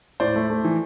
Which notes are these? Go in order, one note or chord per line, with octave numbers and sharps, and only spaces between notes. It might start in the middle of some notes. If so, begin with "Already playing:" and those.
A2 C5 D5
A3
A3
E3